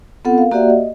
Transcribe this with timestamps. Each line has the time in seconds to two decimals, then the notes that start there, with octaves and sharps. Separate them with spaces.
0.25 B3 C4 F4 A4 F#5
0.38 A#4 F5
0.52 A#3 F#4 G4 D5 E5 F#5
0.70 D#5